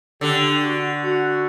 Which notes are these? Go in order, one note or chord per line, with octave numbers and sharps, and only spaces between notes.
D3 G4
F#4
F#4